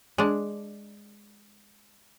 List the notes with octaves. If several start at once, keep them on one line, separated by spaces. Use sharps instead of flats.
G#3 D4